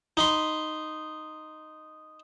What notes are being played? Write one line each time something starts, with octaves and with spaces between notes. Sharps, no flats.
D#4 B5 C6